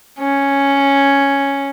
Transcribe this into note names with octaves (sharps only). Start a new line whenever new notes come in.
C#4